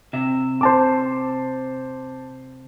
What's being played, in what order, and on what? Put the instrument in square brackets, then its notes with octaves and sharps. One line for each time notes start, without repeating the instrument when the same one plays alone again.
[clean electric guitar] C3 E5
[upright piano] C5 A5 D6